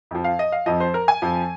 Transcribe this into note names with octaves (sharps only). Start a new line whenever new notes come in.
F2 F3
F5
D#5
F5
F2 F3 D#5
C5
A#4
G#5
F2 F3